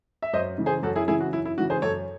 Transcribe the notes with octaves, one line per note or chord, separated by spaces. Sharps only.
E5
F#2 C5 D#5
C#3 E3
G#4 C5
F#2 F#4 A4
E4 G#4
C#3 E3 E4 G#4
F#4
F#2 E4
E4
C#3 E3 F#4
G#4 C5
F#2 A4 C#5